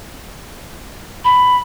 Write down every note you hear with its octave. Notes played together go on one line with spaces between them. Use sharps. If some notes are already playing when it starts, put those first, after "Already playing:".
B5